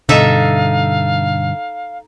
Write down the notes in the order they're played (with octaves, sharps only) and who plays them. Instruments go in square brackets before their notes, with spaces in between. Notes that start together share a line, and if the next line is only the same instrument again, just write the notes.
[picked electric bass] G2 D3 [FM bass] B2 [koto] D#4 A4 E5 [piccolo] F5